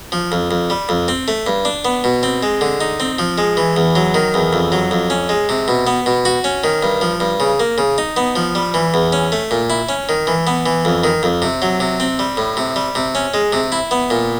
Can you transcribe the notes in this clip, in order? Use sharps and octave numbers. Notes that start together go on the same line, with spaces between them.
F3
F2
F2
G3
F2
C4
A3
G2
D4
B3
B2
C4
G#3
D3
D#4
C4
F3
G#3
E3
E2
F#3
D#3
E2
F2
F#3
F2
C#4
G#3
C3
B2
B3
B2
F#4
C#4
D#3
G2
F3
G2
C#3
A#3
C#3
D#4
B3
F3
G3
E3
E2
C#4
A3
A#2
E4
C#4
D#3
E3
B3
E3
F2
D#3
F2
C3
F#3
C3
C4
G3
A2
C3
G3
C3
C#4
G#3
C3
E4
B3
A#2